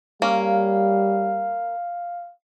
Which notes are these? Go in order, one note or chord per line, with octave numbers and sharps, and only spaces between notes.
G3 A#3 C#4 F5